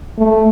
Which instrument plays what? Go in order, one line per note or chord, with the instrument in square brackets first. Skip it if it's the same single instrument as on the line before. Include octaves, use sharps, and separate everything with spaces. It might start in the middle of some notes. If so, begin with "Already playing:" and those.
[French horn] A3